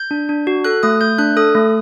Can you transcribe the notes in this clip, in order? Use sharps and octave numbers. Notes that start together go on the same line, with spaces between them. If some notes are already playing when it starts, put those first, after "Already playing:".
Already playing: G6
D4
D4
F#4
A4 F#6
A3 D#6
A3 G6
D4 F#6
A4 D#6
A3